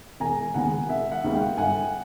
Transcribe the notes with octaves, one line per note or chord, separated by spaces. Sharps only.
E1 G#5 A#5
D#2 D#3 G#3 B3 F#5 G#5
E1 E5 F#5
E5 F#5
D#2 D#3 G#3 B3
F5 G5
G1 F#5 G#5